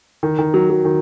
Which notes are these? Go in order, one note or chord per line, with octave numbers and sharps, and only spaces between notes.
D#3
D#3
F#3
F#3
D#3